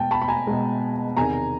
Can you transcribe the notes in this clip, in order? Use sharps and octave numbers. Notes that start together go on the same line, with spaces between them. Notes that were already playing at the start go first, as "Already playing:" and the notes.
Already playing: B2 G#3 G5 A5
A5 B5
B5
G#5 A#5
B2 G#3
E2 C3 D#3 G#5 A#5